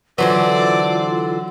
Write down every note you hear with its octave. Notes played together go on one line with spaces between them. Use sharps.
D3 E3 F#3 F4 A4 B4 C5 D5